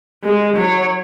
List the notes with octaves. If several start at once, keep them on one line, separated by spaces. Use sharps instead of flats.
G#3
F#3 C#5